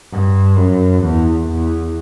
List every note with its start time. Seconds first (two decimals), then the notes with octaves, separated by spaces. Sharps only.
0.12 G2
0.58 F#2
1.03 E2
1.49 E2